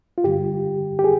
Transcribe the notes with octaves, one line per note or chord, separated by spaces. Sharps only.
F4
G2 D3 G3 G4
G4
G#4